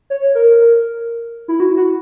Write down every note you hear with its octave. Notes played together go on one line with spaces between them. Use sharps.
C#5
A#4
E4
F#4
F#4